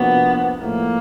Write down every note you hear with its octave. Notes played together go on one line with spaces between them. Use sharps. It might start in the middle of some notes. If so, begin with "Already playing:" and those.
Already playing: C3 F3 A#3 B3 D4 F#4
A2 F3 A3 A#3